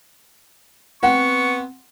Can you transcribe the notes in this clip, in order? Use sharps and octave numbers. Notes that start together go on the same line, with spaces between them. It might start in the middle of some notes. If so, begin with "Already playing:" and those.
B3 C4 F#5 C#6